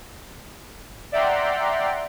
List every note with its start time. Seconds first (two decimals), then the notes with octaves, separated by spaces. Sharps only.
1.12 D5 E5 F#5 G5 A#5 C6